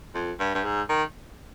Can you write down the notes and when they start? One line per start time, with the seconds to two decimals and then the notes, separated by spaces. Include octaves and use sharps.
0.14 F2
0.39 G2
0.55 G2
0.64 G#2
0.89 D#3